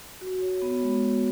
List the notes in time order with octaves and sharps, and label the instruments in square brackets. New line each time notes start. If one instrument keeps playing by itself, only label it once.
[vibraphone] F#4
C#5
B3
G#3
F#4